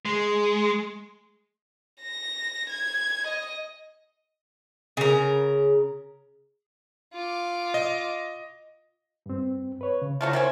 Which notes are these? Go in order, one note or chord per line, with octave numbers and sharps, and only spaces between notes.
G#3
A#6
G#6
D#5
C#3 A#4
F4 D6
D#5
G2 C4
B4 C#5
C#3
F#3 A3 F4
D#3 C4 C#4